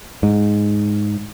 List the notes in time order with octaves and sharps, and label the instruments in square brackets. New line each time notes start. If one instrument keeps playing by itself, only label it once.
[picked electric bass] G#2